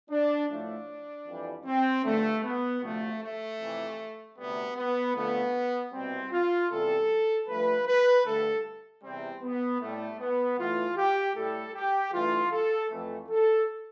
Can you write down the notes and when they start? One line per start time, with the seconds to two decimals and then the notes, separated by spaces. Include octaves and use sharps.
0.10 D4
0.49 A2 F3 A3 D4
1.27 F2 E3 G3
1.66 C4
2.04 G2 D3 F3 A3
2.43 B3
2.82 D2 C3 F3 A3
3.22 A3
3.59 F2 C3 E3
4.37 D2 C3 G3 B3
4.76 B3
5.15 F2 D3 F3 A3 B3
5.92 C2 B2 G3 C4
6.31 F4
6.70 E2 C3 G3 A4
7.48 G2 F3 A3 B4
7.86 B4
8.25 G2 D3 A3 A4
9.02 E2 C3 G3 C4
9.42 B3
9.81 A2 G3 A3
10.20 B3
10.58 A2 E3 A3 F4
10.96 G4
11.35 A2 G3 A4
11.74 G4
12.12 G2 E3 A3 F4
12.51 A4
12.90 F2 E3 A3
13.29 A4